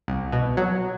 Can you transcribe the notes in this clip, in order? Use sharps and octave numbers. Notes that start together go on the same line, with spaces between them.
C2
B2
F#3